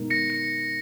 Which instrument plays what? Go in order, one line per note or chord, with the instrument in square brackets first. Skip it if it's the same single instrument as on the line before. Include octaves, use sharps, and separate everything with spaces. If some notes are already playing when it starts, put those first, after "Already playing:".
Already playing: [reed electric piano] B2 G#3 B3 D#4 A#4
[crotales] A#6 C#7
A#6 C#7